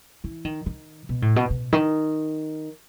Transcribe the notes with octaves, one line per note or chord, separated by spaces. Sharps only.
E3
D#3
D#3
B2
A2
B2
B2
D#3